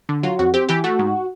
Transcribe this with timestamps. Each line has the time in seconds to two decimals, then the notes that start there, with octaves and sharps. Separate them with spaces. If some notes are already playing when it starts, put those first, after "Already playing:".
0.09 D3
0.23 F#3 F4
0.39 F2 F#4
0.54 C4 G4
0.69 E3 G4
0.84 A3 F#4
0.99 G#2